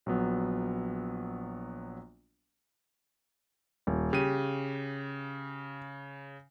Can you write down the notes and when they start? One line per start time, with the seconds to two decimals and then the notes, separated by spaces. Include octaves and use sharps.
0.06 A#1 F#3 B3
3.87 D#1
4.13 C#3 G4 D#7